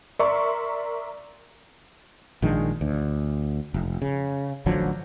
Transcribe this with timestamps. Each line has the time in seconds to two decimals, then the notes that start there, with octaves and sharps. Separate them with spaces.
0.19 A#4 D5 E5 C6 C#6
2.42 A#1 D#3 G#3 D4
2.81 D2
3.74 F1
4.02 C#3
4.66 A1 D3 F3 F#3